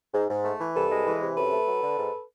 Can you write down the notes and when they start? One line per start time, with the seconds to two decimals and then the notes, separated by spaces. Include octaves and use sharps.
0.13 G#2
0.29 G#2
0.45 A3
0.60 E3
0.75 C2 A4 B4
0.91 G#3
1.06 E3
1.21 C3
1.37 F#2 A4 B4
1.52 A3
1.67 F#3
1.82 D3
1.98 G#2